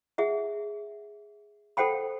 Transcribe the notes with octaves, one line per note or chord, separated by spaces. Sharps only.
G#4 E5 F#5
A4 C5 F#5 G5 B5